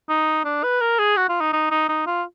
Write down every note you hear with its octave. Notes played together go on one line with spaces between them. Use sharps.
D#4
D4
B4
A#4
G#4
F#4
F4
D#4
D#4
D#4
D#4
F4